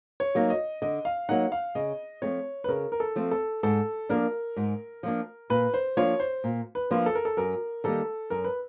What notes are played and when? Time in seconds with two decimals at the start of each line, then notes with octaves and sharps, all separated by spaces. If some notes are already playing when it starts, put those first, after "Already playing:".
0.20 C#5
0.35 F#3 A#3 D#4
0.50 D#5
0.82 D3 D#5
1.05 F5
1.29 F#3 A#3 D#4 F#5
1.52 F5
1.75 C#3 D#5
2.22 F3 A3 C4 C#5
2.64 B4
2.68 C#3 A#4
2.92 A#4
3.00 A4
3.16 F3 A3 C4
3.31 A4
3.63 G#2 A4
4.09 F3 A#3 D4 A#4
4.56 G#2
5.03 F3 A#3 D4
5.50 A#2 B4
5.74 C5
5.97 F3 A#3 D4 F4 C#5
6.20 C5
6.44 A#2
6.75 B4
6.91 F3 A#3 D4 F4
7.06 A4
7.15 A#4
7.25 A4
7.37 F#2 A#4
7.84 D#3 G3 A#3 D#4 A4
8.30 F#2 A#4
8.44 B4